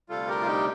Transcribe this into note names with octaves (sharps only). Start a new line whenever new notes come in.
D2 C3 G3 F4 A4
G4 A#4
F4
D#4 G4